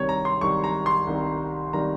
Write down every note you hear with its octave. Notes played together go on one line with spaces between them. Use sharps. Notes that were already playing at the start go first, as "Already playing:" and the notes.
Already playing: C2 C3 D#3 G3 C#5
A#5
C6
C2 C3 D#3 G3 C#6
A#5
C6
C2 C3 D#3 G3
C3 D#3 G3 A#5